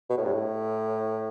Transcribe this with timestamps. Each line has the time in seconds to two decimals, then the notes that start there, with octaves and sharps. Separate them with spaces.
0.10 B2
0.18 A2
0.25 G2
0.33 A2